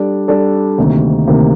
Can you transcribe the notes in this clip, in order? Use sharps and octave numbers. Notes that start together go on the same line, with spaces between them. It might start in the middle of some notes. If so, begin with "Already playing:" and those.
Already playing: G3 D4 A4 D5
G3 D4 A4 D5
D2 C3 D#3 A#3
D2 C3 D#3 A#3